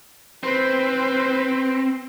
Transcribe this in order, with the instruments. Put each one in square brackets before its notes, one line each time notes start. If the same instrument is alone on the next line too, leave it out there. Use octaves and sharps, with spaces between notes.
[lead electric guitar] C4 [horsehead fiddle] B4 C5